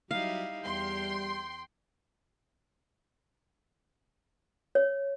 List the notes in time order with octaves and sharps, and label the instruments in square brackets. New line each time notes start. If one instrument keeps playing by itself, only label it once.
[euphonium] F#3 [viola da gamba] G3 D#4 E4 [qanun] F5
[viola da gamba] E2 [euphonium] G3 [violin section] G5 C6
[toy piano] C#5